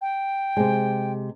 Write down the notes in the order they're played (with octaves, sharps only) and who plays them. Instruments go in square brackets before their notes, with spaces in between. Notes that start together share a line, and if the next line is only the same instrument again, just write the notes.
[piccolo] G5
[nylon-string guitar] C3 G#3